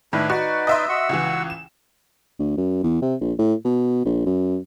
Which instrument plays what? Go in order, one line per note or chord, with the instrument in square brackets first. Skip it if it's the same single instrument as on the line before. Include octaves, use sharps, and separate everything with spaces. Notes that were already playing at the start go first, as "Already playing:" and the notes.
[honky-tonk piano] A2 D#3 [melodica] D4 E4 B4
[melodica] D#4 B4 D5 [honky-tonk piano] F#4
[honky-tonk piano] D#5 E5 C6
[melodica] F#4 F#5 E6
[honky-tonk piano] C#2 E3
E7
[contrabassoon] D2
F#2
E2
C3
A#1
A2
B2
A#1
F#2